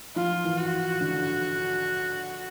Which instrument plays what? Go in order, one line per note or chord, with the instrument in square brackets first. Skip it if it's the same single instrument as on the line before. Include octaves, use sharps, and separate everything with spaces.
[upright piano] F3 [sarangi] F4
[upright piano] E3
[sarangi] F#4
[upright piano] D3